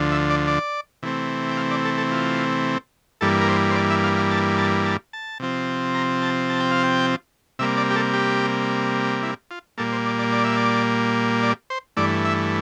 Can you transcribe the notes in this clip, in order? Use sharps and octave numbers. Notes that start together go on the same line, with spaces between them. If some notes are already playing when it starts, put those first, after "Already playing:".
Already playing: D2 D3 F3
E5
D5
D5
C3 E3 A3 C4
G5
F5
D5
A4
A4
F4
G2 E3 G3 A#3 A4
A#4
C5
C5
D5
E5
F5
F5
A5
A5
A5
A5
C3 F3 C4
A#5
A5
A5
G5
F5
G5
C3 G3 A#3 E5
D5
G4
A4
G4
E4
F4
A#2 G3 A#3 A4
C5
D5
D5
D5
E5
D5
D5
C5
G2 E3 A3 D5
E5